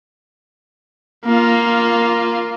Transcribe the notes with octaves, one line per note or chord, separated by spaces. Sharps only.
A#3 F4